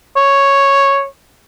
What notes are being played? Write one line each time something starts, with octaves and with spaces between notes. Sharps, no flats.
C#5